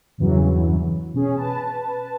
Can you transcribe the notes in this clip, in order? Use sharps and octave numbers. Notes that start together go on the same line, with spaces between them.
E2 G2 C#3 E3 F#3
B2 C#4 G#4
B4 A5